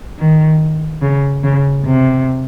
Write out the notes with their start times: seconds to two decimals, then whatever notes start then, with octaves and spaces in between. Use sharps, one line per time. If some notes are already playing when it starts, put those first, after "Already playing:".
0.19 D#3
1.02 C#3
1.44 C#3
1.85 C3